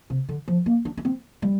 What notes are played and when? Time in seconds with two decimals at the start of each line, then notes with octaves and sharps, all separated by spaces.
0.10 C3
0.29 D3
0.48 F3
0.66 A#3
0.85 D4
0.97 D4
1.05 C4
1.42 G3